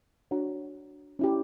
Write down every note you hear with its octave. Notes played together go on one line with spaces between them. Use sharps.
D4 F#4 C#5 F#5 A#5
C#4 E4 G4